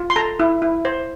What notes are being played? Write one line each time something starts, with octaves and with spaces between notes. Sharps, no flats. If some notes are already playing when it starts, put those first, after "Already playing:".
Already playing: F4
C6
A4 A#5
E4
E4
C5